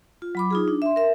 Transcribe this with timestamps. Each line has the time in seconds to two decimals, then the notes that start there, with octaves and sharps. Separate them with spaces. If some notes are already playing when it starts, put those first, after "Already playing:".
0.22 F4
0.35 F#3 B5 D6
0.51 D#4 F4 G#4
0.68 D4
0.82 E5 C6
0.96 A#4 E5